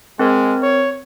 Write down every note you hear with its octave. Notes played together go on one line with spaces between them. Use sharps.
G#3 C4 A#4
C#5